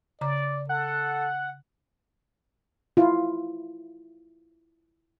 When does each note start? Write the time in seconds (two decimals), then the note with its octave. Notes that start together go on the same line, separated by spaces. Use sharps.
0.21 C#3 D5 A#5 D6
0.69 A4 F#5
2.97 E4 F4